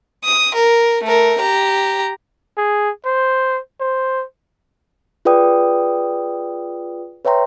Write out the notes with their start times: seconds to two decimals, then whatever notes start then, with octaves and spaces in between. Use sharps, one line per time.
0.24 D#6
0.54 A#4
1.03 A3 A#4
1.39 G4 A#5
2.57 G#4
3.05 C5
3.80 C5
5.25 F4 G#4 B4 D5 G5 D#6
7.25 B4 C#5 E5 G5 A#5 C6